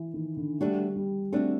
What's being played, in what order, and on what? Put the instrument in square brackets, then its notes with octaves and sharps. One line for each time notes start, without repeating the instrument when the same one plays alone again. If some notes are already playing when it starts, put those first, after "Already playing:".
Already playing: [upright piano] E3
D#3
D3
[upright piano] G3 [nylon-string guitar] A3 D4 F#4
[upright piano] G3
[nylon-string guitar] A3 D4 F#4 [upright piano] C4